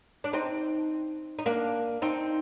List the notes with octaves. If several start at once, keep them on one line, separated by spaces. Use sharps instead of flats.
D4
C4 D#4
D#4
A#3 D4
C4 D#4